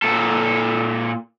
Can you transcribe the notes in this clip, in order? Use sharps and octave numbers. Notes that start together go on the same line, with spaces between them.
A#2 A4